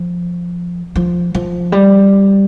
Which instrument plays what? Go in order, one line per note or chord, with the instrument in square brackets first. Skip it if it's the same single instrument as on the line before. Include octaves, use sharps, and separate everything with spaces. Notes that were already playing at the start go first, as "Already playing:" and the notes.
Already playing: [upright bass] F3
F3
F3
G3